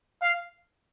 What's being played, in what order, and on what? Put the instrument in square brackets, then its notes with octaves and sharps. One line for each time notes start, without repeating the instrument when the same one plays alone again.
[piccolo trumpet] F5